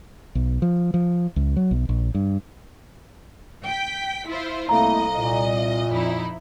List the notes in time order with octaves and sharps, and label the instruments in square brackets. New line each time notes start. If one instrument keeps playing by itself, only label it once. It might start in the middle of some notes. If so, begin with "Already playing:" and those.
[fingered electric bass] B1
F3
F3
C#2
F#3
B1
A#1
G2
[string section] G5 B6
E4 F4 C5
[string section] C2 D#5 [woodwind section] A3 A#3 E4 [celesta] A4 F5 A#5
[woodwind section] A#2
[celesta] E5
[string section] F2 D#4 E4